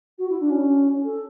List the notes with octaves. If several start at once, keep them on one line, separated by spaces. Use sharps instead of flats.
F#4
E4
D4
C#4
A4